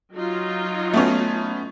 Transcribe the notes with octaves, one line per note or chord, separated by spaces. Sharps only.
F#3 D#4 F4
A3 B3 C#4